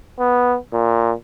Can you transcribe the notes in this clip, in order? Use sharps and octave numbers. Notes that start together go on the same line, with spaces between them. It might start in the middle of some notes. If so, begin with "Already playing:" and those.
B3
A#2